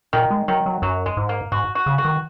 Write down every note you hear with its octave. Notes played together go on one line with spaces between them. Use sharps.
A#2 D#3
G#3
D#3 F#3
F#3
F#2 F#3
G#3
G#2
A#3
G#2 F#4
F#4
C#3
F#4
D#3